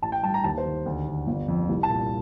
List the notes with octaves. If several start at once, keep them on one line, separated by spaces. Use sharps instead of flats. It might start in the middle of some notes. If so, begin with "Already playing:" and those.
A1 A5
G5
G2 A5
A#5
D#2 A5
C5
D#3
D2
D3
G1
F2
C2
A5
A#2